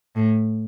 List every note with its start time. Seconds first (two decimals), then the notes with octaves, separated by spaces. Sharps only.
0.16 A2